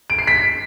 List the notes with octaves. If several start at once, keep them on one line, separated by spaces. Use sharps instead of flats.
D7
C7
B6